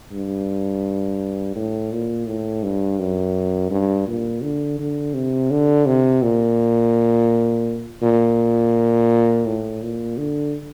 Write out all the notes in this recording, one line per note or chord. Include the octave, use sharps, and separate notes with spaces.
G2
A2
A#2
A2
G2
F#2
G2
A#2
D3
D3
C3
D3
C3
A#2
A#2
A2
A#2
D3